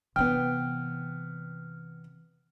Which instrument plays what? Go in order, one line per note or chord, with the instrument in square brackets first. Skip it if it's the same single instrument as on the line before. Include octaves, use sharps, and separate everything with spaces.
[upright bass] C3 E3 [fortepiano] B3 G5 [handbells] F6